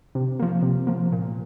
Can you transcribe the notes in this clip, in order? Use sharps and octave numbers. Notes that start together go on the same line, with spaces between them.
C3
F3 A#3
C3
F3 A#3
A#2